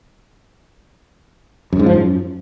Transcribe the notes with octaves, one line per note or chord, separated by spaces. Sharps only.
F#2
G#2
F3
F#2